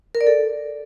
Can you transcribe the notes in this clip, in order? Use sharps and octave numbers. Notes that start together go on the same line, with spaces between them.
A#4
D5
A4